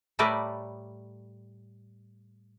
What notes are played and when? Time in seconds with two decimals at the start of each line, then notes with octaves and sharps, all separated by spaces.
0.19 A2 G3 A3 A#4 B4 D5